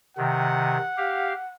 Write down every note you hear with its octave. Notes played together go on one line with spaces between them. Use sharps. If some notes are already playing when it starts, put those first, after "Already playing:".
C3 D#3 F#5
G4 F5